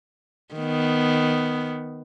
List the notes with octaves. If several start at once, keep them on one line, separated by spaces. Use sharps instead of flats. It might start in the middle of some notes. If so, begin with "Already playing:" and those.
D#3 B3